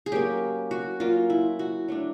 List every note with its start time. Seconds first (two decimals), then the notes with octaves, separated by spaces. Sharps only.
0.06 G#4
0.12 F#3 A#3 C#4 G4
0.71 F#4
1.00 F#3 A#3 C#4 F4
1.30 E4
1.59 F#4
1.88 F#3 A3 D4